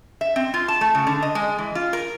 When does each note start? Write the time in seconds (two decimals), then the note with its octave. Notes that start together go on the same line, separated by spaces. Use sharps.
0.21 E5
0.36 C4
0.54 F4
0.68 A5
0.81 A3
0.95 C#3
1.07 D3
1.22 D#5
1.35 G#3
1.58 E3
1.75 F4
1.93 A#4